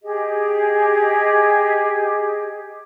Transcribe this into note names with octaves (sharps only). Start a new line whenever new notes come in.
G4 G#4 D#5